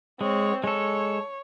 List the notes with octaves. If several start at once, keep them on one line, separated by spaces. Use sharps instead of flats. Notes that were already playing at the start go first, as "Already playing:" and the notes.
G#3 C4 C#5
G#3 A4 C#5